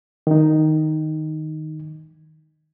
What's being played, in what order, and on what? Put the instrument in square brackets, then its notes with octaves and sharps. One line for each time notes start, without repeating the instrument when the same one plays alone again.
[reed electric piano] D#3 D#4